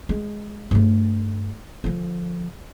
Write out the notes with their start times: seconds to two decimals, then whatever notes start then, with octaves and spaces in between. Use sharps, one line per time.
0.09 G#3
0.71 G2 A3
1.84 D3 F3